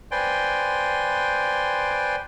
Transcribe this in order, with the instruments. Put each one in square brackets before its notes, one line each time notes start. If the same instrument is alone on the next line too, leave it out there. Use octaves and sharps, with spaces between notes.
[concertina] B4 C5 D5 G5 G#5 C6